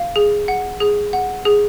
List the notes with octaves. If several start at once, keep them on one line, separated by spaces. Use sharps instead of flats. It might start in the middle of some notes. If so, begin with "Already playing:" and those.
Already playing: F5
G#4
F#5
G#4
F#5
G#4